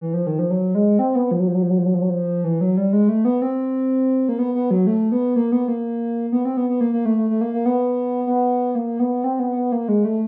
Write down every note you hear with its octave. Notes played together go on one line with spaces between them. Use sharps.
E3
F3
D#3
F3
F#3
G#3
C4
B3
F3
F#3
F3
F#3
F3
F#3
F3
F#3
F3
F#3
F3
E3
F#3
G3
G#3
A3
B3
C4
A#3
B3
B3
F#3
A3
B3
A#3
B3
A#3
B3
C4
B3
B3
A#3
A#3
A3
A3
A3
A#3
A#3
B3
B3
A#3
B3
C4
B3
B3
A#3
G#3
A3